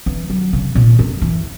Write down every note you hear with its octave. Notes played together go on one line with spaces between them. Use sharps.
E3
F#3
C#3
A#2
F#2
E3